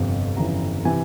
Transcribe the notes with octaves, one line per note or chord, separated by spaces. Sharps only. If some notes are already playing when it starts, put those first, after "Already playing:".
Already playing: G1 F2 C3
G1 F2 C#3 E3 A#5
C3 E3 G#5